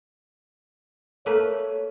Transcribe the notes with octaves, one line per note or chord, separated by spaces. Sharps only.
A3 A#3 B4 C#5